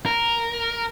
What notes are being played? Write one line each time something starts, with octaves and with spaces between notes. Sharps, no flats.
A#4